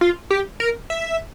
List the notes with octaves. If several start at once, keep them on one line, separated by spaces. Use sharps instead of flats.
F4
G4
A#4
E5